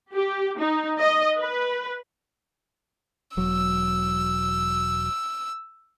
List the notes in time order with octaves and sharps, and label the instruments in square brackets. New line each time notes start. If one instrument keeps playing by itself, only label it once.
[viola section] G4
D#4
D#5
B4
[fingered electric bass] E1 F#3 [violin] E6